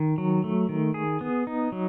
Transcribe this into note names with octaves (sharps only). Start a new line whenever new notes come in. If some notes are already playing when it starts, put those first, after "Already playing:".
Already playing: D#3
F#3
A3
D#3
G#4
B3
D#4
F#3